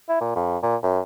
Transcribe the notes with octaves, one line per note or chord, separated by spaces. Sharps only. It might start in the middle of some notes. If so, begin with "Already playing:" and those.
E4
A#2
F2
A#2
F#2